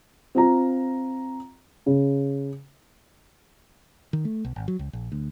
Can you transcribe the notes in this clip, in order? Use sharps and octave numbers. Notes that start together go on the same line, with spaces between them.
C4 F4 A#5
C#3
D#3
A3
B1
G#1
F#3
C#2
A#1
D2